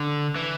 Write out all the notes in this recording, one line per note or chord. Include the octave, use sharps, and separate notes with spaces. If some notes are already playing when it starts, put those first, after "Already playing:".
Already playing: D3
E3